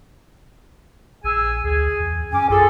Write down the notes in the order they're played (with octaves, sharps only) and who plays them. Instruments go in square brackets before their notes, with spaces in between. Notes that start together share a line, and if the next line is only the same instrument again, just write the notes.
[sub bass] A#1 [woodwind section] G#4 G#5 E6
[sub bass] D2 [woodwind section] G#4 G#5
[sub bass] E2
[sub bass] F#2 [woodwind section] C#4 D6 [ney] G#5
[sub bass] A#1 [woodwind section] F4 A4 [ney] G#4